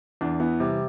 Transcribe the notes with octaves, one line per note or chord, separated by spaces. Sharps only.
E2 D4
E3 B3
C3 G3